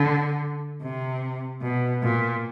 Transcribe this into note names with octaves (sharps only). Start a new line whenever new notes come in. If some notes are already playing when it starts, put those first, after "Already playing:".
Already playing: D3
C3
B2
A#2